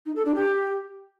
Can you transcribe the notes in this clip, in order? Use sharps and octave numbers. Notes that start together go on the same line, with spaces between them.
D#4
A4
D4
G4